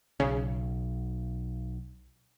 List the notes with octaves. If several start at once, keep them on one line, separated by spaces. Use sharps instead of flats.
B1 C#3